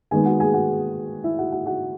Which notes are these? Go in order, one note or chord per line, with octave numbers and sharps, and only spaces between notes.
D#3 G#3 B3 G#4 G#5
F#4 F#5
G#4 G#5
F#4 F#5
E4 E5
F#4 F#5
F#4 F#5
F#4 F#5